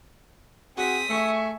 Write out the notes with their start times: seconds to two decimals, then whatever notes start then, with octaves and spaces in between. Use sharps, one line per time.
0.77 C4 F#4 G#4 D#6 B6
1.10 A3 E5 G#5 C#6